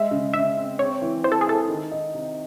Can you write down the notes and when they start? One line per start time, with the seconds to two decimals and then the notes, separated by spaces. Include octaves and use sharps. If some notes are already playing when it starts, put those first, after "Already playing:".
Already playing: G#3 E5
0.11 C#3
0.34 C#3 E5
0.57 C4
0.79 C4 C#5
1.02 E3
1.24 E3 C5
1.32 A4
1.41 G#4
1.47 E4 A4
1.68 D#3
1.92 D#4
2.14 C3